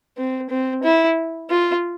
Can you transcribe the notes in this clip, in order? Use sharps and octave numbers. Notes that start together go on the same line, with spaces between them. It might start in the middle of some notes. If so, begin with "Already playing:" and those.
C4
C4
E4
F4